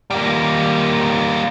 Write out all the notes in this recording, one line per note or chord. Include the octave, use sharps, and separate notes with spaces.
G3 A#3